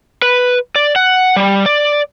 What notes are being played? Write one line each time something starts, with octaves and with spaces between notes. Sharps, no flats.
B4
D5
F#5
G3
D5